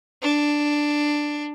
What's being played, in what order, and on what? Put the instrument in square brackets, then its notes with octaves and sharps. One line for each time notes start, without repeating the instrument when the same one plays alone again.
[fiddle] D4